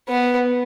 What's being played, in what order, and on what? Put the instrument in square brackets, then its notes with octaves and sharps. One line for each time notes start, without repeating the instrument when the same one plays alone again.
[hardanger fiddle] B3